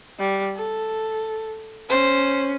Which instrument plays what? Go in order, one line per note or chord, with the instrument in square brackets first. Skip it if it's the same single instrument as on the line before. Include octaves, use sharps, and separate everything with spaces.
[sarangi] G3
A4
[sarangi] C#4 [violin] C5